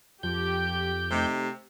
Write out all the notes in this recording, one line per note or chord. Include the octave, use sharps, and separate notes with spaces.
F2 F3 G4 G6
C3 A3 D#4